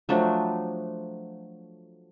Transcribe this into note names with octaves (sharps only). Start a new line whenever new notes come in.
F3 F#3 A3 D4